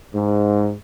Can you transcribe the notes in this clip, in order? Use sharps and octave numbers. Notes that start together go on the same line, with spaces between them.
G#2